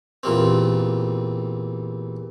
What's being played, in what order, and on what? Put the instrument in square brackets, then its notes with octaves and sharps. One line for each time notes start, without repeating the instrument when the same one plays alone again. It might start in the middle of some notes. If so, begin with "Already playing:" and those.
[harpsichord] E2 A#2 G3 C4